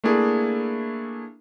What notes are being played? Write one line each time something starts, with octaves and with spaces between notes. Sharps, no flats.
A3 A#3 D4 E4 G#4